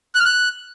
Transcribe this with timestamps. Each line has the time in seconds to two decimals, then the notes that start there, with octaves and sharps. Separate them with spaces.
0.15 F#6
0.20 F6
0.25 F#6